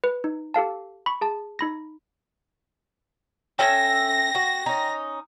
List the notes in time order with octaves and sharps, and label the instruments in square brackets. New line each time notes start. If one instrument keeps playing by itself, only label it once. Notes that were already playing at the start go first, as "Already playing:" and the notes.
[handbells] B4
D#4
G4 A4 F5 A5
B5 C#6
G#4 A5
D#4 B5 A#6
[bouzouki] C#4 A4 E5 [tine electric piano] G5 [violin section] A#6
[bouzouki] F#4
C#4 D#4